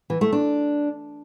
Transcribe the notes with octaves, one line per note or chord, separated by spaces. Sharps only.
E3
A3
D4